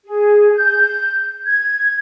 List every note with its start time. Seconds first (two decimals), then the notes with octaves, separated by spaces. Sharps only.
0.05 G#4
0.55 G6
1.44 G#6